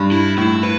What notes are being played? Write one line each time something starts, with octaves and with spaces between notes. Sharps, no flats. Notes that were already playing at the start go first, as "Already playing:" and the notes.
Already playing: G2
E4
A2 E4
B4